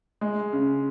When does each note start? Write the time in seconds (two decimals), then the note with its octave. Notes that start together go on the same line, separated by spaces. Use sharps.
0.21 G#3
0.53 C#3